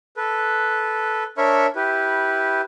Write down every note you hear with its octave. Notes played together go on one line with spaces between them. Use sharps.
A4 B4
D4 A#4 C#5 E5 B5 C#6
E4 G4 B4